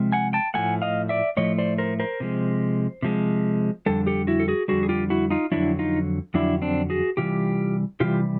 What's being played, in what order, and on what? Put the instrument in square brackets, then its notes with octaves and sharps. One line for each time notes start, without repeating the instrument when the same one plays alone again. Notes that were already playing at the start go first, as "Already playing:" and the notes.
Already playing: [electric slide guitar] C3 F3 G#3
F#5 G#5
G5 A5
A2 F3 A3 F#5 G#5
D#5 F5
D5 E5
A2 F3 A3 C#5 D#5
C5 D5
A#4 C5
A#4 C5
C3 F3 G#3
C3 F3 G#3
F2 D3 G3 A4
G4 A4
E4 F#4
A4
F#4 G#4
F2 D3 G3 F#4 G#4
G#4
F4 G4
E4 F#4
D#4 F4
F2 D3 F#3 D4 E4
D#4 F4
F2 D3 F#3 D4 E4
C4 D4
F#4 G#4
C3 E3 G3 F4 G4
C3 E3 G3 F4 G4